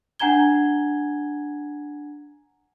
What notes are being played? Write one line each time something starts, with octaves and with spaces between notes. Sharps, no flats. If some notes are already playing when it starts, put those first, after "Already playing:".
D4 F#5 G#5 A#5 G#6 G7